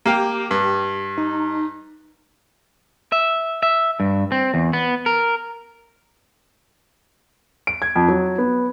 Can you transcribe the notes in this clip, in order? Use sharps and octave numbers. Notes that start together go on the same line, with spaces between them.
A#3 G4 F5 G5
G2
D#4
E5
E5
G2
C4
E2
B3
A#4
D7
G#6
F2
F#3
B3